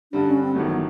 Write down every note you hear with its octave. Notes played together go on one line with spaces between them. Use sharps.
G2 D3 G3 D4
C#4
C4
A1 G2 D#3 F#3 A3 B3